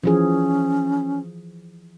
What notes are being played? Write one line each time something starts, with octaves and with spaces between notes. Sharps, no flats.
E3 F3 C#4 G#4